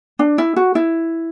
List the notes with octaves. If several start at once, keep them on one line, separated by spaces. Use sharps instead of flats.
D4
E4
F#4
E4